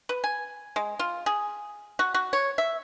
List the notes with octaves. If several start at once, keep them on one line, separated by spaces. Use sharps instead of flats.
B4
G#5
G#3
F4
G#4
F#4
F#4
C#5
E5